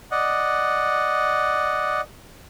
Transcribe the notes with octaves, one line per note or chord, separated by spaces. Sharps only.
D5 D#5 F#5